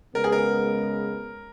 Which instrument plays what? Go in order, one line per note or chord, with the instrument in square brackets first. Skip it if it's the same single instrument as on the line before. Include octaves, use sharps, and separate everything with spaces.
[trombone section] C#3 G#3 B3 [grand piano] A#4
[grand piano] G#4
A#4